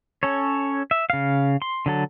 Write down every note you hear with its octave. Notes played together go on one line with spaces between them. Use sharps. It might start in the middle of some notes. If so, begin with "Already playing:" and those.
C#4 A4 C#5
E5
C#3 F5
C6
D3 F#3 A4